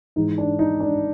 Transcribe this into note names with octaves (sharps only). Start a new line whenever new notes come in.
G#2 E3 G#3 D#4
D4
D#4
D4